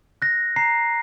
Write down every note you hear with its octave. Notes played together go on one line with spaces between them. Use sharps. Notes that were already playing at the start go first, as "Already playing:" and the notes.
F#6 A#6
A#5 C7